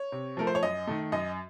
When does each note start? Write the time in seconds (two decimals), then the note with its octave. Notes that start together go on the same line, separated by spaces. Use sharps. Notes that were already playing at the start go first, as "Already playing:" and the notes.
Already playing: C#5
0.12 C3
0.37 F3 A3 A#4
0.47 C5
0.55 C#5
0.63 F#2 D#5
0.87 D#3 A3
1.12 F#2 D#5